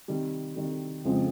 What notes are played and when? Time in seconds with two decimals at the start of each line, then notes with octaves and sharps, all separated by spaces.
0.08 C3 D#3 G3
0.56 C3 D#3 G3
1.04 F2 C#3 F3 G#3 C4